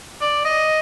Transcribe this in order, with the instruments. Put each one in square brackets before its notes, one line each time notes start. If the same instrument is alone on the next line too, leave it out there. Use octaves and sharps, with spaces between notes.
[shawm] D5
D#5